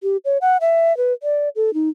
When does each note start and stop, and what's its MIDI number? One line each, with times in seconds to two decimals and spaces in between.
0.03 0.17 67
0.25 0.38 73
0.41 0.57 78
0.61 0.96 76
0.97 1.13 71
1.23 1.49 74
1.56 1.73 69
1.74 1.89 63